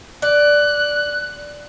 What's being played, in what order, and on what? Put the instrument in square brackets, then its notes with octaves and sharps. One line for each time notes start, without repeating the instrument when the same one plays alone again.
[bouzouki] D5 [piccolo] F#6